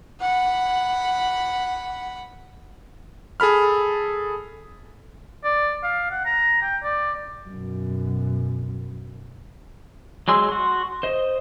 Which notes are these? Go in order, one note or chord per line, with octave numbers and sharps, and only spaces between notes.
F#5 B5
G#4 A4 B5 F6
D5
F5
F#5
A#5
G5
D5
F#2 B2
F#3 G#3 G#5 C6 E6
F#4 C6
C5 D#5